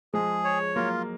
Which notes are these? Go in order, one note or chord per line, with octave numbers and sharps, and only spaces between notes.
F3 G#3 G#4
C#5
F#3 A#3 F4